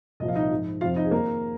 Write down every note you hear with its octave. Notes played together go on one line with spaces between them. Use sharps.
C2 A#2 F3 D#5
F5
D#4 D#5
G#2 F3
F2 C3 F3 F4 F5
D#4 D#5
G#4
D#2 D#3 A#3 A#4